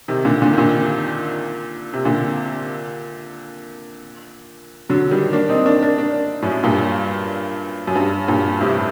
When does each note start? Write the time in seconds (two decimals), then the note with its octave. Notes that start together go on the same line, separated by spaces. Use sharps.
0.08 C3 D#3
0.25 A#2 D3
0.42 A#2 D3
0.53 D#3
0.58 A#2 D3
1.93 C3
2.05 A#2 D3
4.89 D3 F#3
5.11 D#3 G3
5.33 A#3 D4
5.49 C4 D#4
5.66 A#3 D4
5.82 A#3 D4
5.98 A#3 D4
6.42 F#2 A2
6.64 G2 A#2
7.87 F#2
7.95 G2
8.28 G2 A#2
8.61 A2 C3